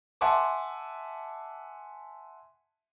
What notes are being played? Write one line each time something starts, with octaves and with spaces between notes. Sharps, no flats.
E5 F#5 G#5 A5 C6 D6